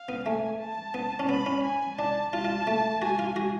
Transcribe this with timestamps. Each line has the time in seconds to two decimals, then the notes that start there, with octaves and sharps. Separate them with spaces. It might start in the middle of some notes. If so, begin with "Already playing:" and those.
Already playing: F5
0.09 B3
0.25 A3 G#5
0.60 A5
0.94 B3
1.19 C#4
1.29 B3 B5
1.46 C#4
1.63 G#5
1.98 D4 A5
2.32 F4 A5
2.45 F4
2.67 A3
3.01 F#4 G#5
3.19 F4
3.36 F#4